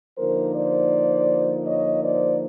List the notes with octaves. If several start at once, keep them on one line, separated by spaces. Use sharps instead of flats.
D3 F3 A#3 D#4 A#4 C5
C5 D5
C#5 D#5
C5 D5